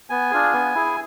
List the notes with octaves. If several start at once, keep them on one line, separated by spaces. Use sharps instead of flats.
B3 G#5
D4 F4 G#4
B3
E4 G#4